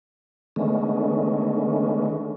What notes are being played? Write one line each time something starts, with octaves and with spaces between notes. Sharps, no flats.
D3 D#3 G#3 A3 B3 C#4